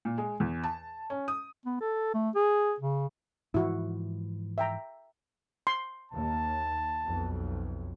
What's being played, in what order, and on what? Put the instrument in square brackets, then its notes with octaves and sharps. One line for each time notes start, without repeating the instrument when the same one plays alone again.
[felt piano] A#2
G#3
E2
A5
C#4
D#6
[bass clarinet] B3
A4
A3
G#4
C#3
[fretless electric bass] G#2 E3 F3 [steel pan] E4 F#4
[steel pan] E5 G5 A#5
C6
[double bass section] D#2 [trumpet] A5
[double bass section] B1 F2